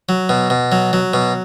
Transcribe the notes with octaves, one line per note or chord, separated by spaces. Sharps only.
F#3
B2
B2
F#3
F#3
B2